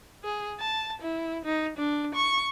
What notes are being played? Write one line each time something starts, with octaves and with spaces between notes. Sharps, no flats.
G#4
A5
E4
D#4
D4
C#6